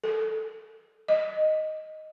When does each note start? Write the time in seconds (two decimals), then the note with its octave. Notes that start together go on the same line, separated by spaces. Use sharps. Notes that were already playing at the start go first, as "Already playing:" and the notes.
0.04 A4
1.08 D#5